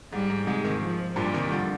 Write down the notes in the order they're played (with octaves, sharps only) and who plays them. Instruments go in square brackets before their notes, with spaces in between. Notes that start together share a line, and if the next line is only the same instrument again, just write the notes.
[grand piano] G#2 [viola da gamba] G3
[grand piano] G#2
[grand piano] G#2 C3 [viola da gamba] G#3
[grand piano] C3 D#3
[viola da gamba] F3
[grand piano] G2 A#2 [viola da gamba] G3
[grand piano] C3 D#3
D3 F3